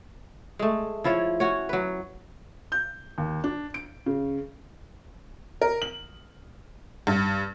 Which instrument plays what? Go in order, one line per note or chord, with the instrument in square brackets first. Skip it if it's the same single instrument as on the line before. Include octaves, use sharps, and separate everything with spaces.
[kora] G#3 A3
F3 E4 F4 C#5
C#4 F#4 C#5
F#3 B4
[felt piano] G6
D#2
D4
D7
C#3
[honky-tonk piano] A#4
F#7
G2